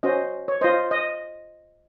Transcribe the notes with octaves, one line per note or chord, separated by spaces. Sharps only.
C#4 F#4 C5 D#5
C#5
F4 C5 D#5
D#5